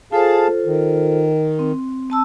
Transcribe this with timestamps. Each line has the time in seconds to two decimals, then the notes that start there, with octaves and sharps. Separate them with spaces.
0.12 F4 G#4 A4 C5 F5 A5
0.66 D#3
1.59 C4
2.10 C4 A5 E6